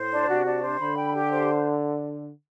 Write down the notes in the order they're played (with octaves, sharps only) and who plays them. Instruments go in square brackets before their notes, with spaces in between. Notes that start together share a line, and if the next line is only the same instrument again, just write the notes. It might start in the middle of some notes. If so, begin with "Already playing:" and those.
Already playing: [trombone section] A2 [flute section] C5
[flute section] D4
[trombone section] C3 [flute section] F#4
[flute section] D4
C5
[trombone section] D3 [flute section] B5
[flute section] G5
G4
C5